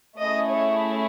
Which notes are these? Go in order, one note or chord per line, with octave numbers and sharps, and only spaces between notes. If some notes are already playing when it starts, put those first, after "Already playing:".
A3 C#4 E4 G#4 D#5
C#5